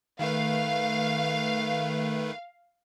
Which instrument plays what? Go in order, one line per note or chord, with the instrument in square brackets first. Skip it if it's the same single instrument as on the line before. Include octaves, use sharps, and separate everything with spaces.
[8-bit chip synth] D#3 A3 B4 [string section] F5